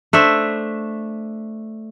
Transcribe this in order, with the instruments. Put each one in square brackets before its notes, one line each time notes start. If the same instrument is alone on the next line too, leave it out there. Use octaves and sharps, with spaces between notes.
[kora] A3 D4 C5 E5